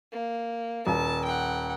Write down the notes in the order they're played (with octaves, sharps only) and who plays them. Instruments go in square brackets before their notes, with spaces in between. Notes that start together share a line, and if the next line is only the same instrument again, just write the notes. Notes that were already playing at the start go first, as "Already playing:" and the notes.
[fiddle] A#3
[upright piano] D#1 [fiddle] A5
[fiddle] F#5 G5